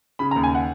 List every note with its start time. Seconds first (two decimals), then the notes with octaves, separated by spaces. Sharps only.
0.19 C#3 B5
0.31 A#5
0.36 D#2
0.44 G#5
0.55 F#5